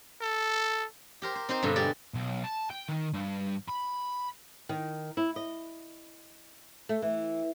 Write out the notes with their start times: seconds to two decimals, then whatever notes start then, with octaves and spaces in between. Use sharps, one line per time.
0.22 A4
1.22 G4 A#4 C5
1.35 C5
1.49 C4 D#4 C5 C6
1.63 G2 B2 D3
1.76 G4 G#4 D5
2.14 B1
2.44 A5
2.70 G5
2.89 D#3
3.14 G2
3.69 B5
4.69 D#3
5.17 E4
5.36 D#5
6.89 A3
7.02 E3